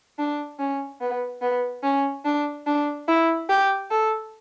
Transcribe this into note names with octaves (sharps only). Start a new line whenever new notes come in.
D4
C#4
B3
B3
C#4
D4
D4
E4
G4
A4